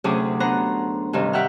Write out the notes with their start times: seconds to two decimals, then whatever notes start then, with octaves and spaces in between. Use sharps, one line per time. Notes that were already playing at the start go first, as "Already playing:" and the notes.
0.04 D2 C3 F#3 C#4 G#4 D6
0.40 B3 D4 C5 F#5 A#5
1.13 G2 C3 D#3 C4 C#4
1.33 G4 E5 F#5 G5 F6